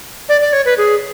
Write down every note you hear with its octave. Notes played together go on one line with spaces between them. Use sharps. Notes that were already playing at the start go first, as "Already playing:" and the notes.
D5
D5
C#5
B4
G#4